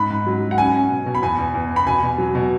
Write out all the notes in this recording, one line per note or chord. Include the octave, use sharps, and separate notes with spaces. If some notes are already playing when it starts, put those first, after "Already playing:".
Already playing: G#2 B5
G#2
F#3
F#3
F#5
C#4 G#5
C#4
B2
B2
B5
E2 G#5
E2
E2
E2
B5
B2 G#5
B2
F#3
B2